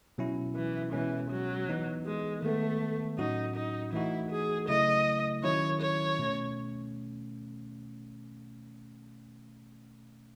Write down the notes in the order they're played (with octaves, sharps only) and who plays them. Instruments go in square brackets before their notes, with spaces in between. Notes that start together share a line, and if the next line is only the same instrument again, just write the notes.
[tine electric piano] B2 F#3 C#4 E4
[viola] E3
[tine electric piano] B2 G#3 C#4 [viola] E3
[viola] F#3
[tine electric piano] E3 B3 D#4
[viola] G#3
[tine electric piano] D#3 G#3 B3 [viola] A3
[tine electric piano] A2 F#3 C#4 F#4 [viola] D#4
[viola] D#4
[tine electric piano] E3 A3 D#4 F#4 [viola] E4
[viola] G#4
[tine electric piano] C#3 F#3 A3 E4 [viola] D#5
[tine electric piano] D#3 F#3 C#4 E4 [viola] C#5
[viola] C#5
[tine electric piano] B2 A3 C#4